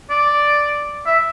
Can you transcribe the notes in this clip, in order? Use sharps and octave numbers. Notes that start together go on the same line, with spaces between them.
D5
E5